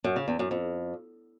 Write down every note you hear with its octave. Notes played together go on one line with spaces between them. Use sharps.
F#2
C#3
E2
F#2
F2